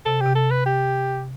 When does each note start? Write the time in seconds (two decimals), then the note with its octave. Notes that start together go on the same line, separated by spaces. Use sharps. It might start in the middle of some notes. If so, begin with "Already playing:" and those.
0.06 C3 A4
0.21 C3 G4
0.35 A4
0.51 B4
0.66 G4